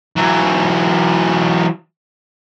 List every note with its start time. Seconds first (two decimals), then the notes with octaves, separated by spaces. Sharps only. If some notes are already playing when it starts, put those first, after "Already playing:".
0.16 E3 F#3